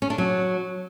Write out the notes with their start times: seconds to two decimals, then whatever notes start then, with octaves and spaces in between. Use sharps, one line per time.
0.02 C#4
0.10 D4
0.18 F#3